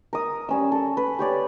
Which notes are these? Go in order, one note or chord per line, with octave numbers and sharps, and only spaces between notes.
A#4 D#6
G3 C#4 E6
A4
B4
G4 C#5 D5